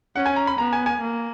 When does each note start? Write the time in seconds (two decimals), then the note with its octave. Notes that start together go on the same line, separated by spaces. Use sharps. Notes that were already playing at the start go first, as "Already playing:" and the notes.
0.16 C#4 F#5
0.26 G#5
0.36 A#5
0.47 B5
0.58 B3 A#5
0.73 G#5
0.86 G#5
1.01 A#3